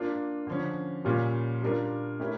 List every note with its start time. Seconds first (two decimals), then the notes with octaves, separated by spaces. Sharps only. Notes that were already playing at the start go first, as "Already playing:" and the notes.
Already playing: A#3 D4 F4
0.47 D3 F3 C#4
1.05 A#2 G3 C#4 F4
1.62 G3 D4 F4 A#4
2.20 A3 C#4 E4 G4 A#4